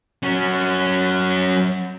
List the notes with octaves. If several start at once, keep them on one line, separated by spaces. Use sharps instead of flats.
F#3 C#4